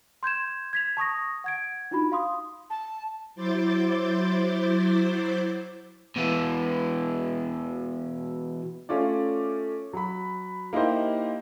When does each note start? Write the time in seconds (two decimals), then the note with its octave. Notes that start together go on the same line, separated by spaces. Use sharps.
0.23 C6 G6 G#6 E7
0.73 G#6 B6 F7
0.97 A5 C#6 D#6 A#6
1.44 F#5 G#6 D7
1.91 D4 D#4 F4 F#4 B5
2.12 F5 C6 D#6
2.70 A5
3.35 F#3 E4 C5 D6 G6 A6
6.16 B2 E3
8.89 A3 C#4 F4 D5
9.93 F#3 B5
10.73 A#3 D#4 E4 G4 C5 D#5